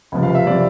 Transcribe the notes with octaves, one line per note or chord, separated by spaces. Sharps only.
C#2 C3 F3
F5
E5
C3 F3 D5